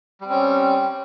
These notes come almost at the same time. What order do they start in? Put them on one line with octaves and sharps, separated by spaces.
G3 C4 C#4